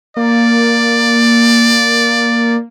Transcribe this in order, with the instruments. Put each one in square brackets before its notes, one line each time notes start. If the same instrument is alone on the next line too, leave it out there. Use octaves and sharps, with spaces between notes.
[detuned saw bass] A#3 [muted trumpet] D5